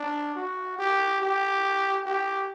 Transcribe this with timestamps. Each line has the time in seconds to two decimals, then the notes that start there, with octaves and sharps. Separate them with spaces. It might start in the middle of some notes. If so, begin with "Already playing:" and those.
Already playing: D4
0.36 F#4
0.79 G4
1.22 G4
2.06 G4